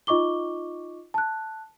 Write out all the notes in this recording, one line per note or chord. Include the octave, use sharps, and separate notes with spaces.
D#4 F4 D#5 C#6 D6 G7
A5 F#6